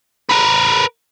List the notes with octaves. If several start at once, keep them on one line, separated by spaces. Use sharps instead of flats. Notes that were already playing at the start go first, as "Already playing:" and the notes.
A#4 B4